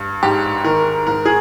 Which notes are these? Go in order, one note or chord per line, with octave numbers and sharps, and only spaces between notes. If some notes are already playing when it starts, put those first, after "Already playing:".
Already playing: G2
G#2 G4
D#3 A#4
G#2 A#4
G#4